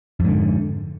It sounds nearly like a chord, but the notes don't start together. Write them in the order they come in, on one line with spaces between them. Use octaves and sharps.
F2 G#2 D3